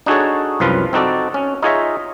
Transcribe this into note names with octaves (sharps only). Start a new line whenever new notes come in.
D4 D#4 F#4 G#4 A4 C#5
C2 F#2 F3 F4 B4
C4 D#4 F#4 A4 D5
C#4
D#4 F4 G#4 C#5 D#5 E5